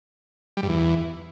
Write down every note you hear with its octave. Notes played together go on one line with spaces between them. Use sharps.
G3
G2
E2